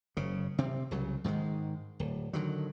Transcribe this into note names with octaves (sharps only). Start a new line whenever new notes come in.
F#1 C#3
C3 C4
C2 C#3 F#3
G#2 D#3 E3 G#3
D1
D3 D#3 F#3